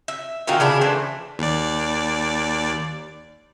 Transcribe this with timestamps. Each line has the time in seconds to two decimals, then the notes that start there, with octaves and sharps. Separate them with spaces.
0.08 E5
0.47 A#2 D#3 F4 F#4
0.60 C#3 D4 E4
0.81 E3 A3 D4 C5
1.39 D#2 D5